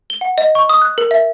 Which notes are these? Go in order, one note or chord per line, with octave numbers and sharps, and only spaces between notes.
G7
F#5
D#5
C#6
D#6
F#6
A#4
E5